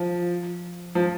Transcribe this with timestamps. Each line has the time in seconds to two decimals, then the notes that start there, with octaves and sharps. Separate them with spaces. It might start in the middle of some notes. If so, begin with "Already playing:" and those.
Already playing: F3
0.95 F3